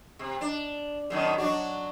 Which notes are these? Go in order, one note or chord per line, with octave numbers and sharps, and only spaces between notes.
C3
D4
F#2 B2 D#3
F#3 D4 F#4